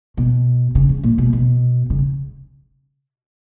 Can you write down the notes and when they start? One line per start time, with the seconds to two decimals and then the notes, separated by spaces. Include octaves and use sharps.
0.17 B2
0.75 C#3
0.89 C#3
1.03 A#2
1.18 B2
1.33 B2
1.90 C#3